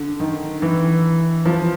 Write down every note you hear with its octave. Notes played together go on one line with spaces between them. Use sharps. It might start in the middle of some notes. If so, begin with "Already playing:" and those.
Already playing: D3
D#3
E3
F3